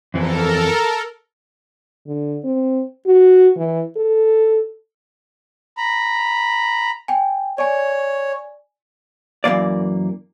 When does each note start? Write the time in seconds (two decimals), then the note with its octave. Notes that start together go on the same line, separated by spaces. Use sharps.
0.14 F2 E3 A4 A#4
2.07 D3
2.44 C4
3.06 F#4
3.56 E3
3.96 A4
5.77 A#5 B5
7.08 G5 G#5
7.58 C#5 D5 G#5
9.44 F#2 E3 A#3 D5